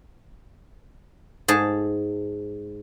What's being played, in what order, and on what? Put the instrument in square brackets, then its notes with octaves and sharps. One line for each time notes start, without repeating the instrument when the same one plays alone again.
[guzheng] G#2 G#4 A5